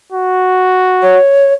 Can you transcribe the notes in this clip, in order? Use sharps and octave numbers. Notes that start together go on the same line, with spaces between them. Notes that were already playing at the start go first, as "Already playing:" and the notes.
F#4
C#5